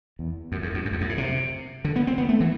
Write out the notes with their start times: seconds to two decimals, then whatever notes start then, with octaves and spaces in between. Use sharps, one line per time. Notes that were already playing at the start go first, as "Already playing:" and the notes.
0.19 E2
0.52 F#2
0.62 E2
0.74 F#2
0.85 F#2
0.93 E2
1.01 F#2
1.09 A2
1.18 C3
1.85 D3
1.96 B3
2.07 C4
2.18 B3
2.29 A3
2.40 E3